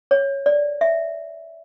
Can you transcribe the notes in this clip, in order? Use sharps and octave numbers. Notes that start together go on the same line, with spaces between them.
C#5
D5
E5